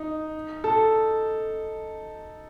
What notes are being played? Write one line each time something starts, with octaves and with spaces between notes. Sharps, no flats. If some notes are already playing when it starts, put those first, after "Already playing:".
Already playing: D#4
A4